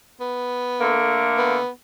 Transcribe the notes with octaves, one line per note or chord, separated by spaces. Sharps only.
B3
D3 A3 A#3
B3